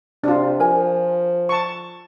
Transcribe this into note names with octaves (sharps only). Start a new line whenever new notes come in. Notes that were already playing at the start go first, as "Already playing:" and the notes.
C3 D4 F4
F3 A#4 G#5
A5 C#6